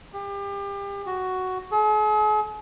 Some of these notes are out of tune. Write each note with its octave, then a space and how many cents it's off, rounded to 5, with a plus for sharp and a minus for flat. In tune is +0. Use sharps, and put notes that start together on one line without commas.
G4 +30
F#4 +5
G#4 +45